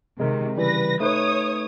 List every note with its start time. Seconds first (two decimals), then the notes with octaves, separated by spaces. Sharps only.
0.20 C3 D#3 G#3 A#4
0.57 C#3 E3 G3 B4 A#6
1.00 A3 D#4 B4 C#5 D#6